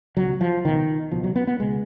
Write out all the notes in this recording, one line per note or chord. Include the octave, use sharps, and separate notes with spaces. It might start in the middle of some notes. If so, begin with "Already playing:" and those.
C#2 B2 F#3
F3
C#2 B2 D#3
C#2 B2 F3
F#3
B3
B3
C#2 B2 G#3